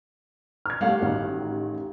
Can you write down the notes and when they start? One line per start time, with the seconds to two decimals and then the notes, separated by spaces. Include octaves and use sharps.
0.66 F6 G#6
0.81 G3 A3 G4 F5 F#5
1.00 A1 D#3 F#4